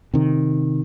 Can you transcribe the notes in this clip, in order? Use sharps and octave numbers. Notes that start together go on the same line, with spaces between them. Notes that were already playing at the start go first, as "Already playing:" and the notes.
C3 D#3